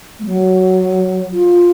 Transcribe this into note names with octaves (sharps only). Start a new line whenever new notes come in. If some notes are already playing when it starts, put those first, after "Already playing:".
A3
F#3
F4